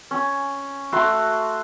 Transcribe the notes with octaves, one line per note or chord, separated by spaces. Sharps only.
C#4
A3 F#4 C6